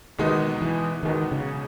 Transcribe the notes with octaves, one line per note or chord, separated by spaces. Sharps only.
E2 B2 D#3 G#3 B3 D#4
E3
E2 B2 D#3 G#3 B3 D#4
C#3